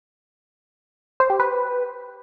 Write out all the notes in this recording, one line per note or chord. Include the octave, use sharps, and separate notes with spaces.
C5
G4
B4